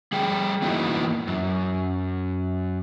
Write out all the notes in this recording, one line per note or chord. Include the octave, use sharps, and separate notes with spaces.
G3 G#4 G5
E3 A#3 B3 D#4 E4 F#4
F#2